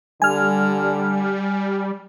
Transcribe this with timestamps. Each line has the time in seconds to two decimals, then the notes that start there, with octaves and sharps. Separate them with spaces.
0.22 D3 G3 G#5 F6